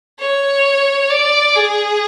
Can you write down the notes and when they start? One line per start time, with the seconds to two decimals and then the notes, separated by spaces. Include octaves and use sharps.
0.19 C#5
1.10 D5
1.55 G#4